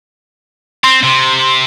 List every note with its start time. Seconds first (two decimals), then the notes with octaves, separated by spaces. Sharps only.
0.84 C4 C6
1.03 C3